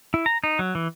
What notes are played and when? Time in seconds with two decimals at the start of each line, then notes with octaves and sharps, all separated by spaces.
0.14 E4
0.26 A#5
0.44 D#4
0.59 F#3
0.75 E3